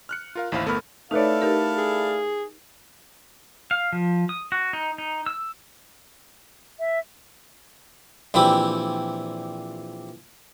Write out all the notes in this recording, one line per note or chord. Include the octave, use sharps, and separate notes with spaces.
F6 F#6 C#7
F4 A#4 F5
A1 D#2 E4 C5 F5 B5
G1 A3 B3 A#4 B5 F6
A3 D#4 E4 A4 B4 C#5 D5 F5
D#4 G4 A#4
G#4
F5
F3
D#6
F#4
D#4
D#4
E6
E5
A#1 E3 C4 E4 G4